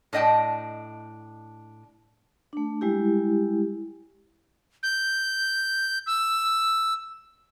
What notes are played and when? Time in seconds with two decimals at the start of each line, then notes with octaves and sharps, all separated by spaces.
0.13 A2 D4 D#5 G5 A5
2.53 A3 D4
2.81 G3 G#3 E4 G4
4.83 G6
6.06 E6